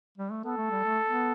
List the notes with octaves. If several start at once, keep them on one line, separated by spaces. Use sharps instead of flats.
G3
A3
B3 A4
A3
G3
A3
B3